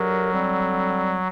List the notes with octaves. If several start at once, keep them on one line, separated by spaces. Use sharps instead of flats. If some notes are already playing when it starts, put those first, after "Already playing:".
Already playing: F#3 A3 D4 G4 A#4
D3 G3 C4